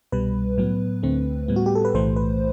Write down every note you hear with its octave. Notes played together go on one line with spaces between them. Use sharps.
C2 B2 G3 B4
A2 F#3 B3
D2 D3 A3 C4
A2 G3 B3
F#4
G4
A4
B4
B1 A2 E3 A3 C5
B4